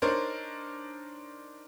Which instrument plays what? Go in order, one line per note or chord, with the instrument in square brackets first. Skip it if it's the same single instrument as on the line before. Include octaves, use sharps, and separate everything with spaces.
[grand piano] D4 D#4 A#4 C5 C#5